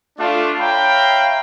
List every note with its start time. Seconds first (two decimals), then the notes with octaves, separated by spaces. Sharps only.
0.19 A3 D4 F4
0.60 C#5 E5 F5 G5 A#5 B5